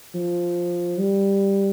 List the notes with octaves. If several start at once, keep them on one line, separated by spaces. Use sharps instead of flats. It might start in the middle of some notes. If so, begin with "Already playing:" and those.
F3
G3